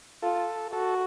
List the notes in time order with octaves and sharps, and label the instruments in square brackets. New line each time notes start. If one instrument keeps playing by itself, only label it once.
[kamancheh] F4 [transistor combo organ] A4
[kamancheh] F#4 [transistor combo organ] A4